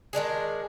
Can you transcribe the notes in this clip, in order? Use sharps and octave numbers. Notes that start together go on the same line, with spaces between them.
D#3 G#3 D4 G#4